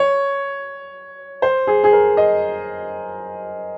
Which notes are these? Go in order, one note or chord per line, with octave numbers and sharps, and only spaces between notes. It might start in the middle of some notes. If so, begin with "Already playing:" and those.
Already playing: C#5
C5
G#4
G#4
A#4
D#5